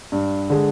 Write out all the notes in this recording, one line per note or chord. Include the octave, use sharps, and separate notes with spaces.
G2
D3 G#3